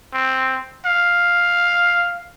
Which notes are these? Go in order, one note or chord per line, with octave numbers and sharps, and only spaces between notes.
C4
F5